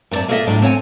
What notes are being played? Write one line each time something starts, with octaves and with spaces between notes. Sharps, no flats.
F#2 B3 C4 D5 A5
A#3 G#4 A4 B4 D#5 E5
A2 F#3 D4
C4 C#5 F#5 G#5